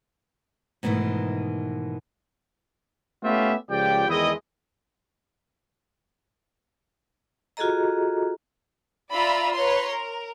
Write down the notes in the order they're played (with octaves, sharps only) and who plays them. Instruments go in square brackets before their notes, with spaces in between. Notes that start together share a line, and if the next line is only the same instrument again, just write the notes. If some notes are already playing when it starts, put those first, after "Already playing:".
[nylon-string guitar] G#2 B2 D#3 E3 A3
[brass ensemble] A3 B3 C#4 F4 G4 E5
C#2 F3 G4 D5 G5
E2 D#3 G#3 E4 D#5
[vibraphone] F4 F#4 G#4 A4 D#5 A#5
[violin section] F4 D5 E5 A#5 B5 E6
B4 C#5 A#5 C6
A#4